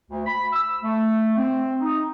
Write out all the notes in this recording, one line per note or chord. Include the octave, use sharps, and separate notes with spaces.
D2
B5
E6
A3
C4
D#4